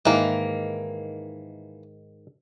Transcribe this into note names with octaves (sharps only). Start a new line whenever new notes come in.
G#2 D#3 E3 A#3